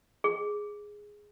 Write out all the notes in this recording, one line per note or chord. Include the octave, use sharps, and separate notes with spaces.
G#4